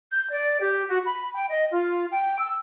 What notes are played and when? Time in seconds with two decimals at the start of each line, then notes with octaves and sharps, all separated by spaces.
0.12 G6
0.30 D5
0.61 G4
0.89 F#4
1.04 B5
1.34 G5
1.50 D#5
1.72 F4
2.12 G5
2.38 E6